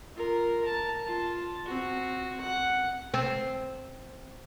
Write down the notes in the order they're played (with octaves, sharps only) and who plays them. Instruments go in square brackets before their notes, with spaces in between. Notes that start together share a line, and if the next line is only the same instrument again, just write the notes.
[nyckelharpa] F4 A#4
A#4 A5
F4 A5
C4 F#4
F#5
[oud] C4